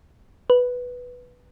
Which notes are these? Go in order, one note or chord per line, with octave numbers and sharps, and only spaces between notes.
B4